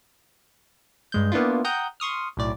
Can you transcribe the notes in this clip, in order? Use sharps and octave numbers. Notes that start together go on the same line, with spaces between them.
G2 G#3 G6
A#3 B3 D4 E4 F4
F#5 G5 A#5 D#6 G6
C6 C#6 D#6 F6
B1 A2 D5